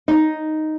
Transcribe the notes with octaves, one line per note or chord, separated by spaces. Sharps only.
D#4